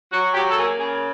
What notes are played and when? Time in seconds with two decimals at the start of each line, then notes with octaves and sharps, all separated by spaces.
0.12 F#3 F#4
0.34 F#3 G4
0.51 A4
0.56 A#3 G#4
0.78 C#3 G#4